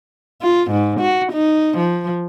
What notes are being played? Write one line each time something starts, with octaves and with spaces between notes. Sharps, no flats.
F4
G#2
F#4
D#4
F3